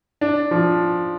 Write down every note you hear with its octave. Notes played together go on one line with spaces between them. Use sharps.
D4
F3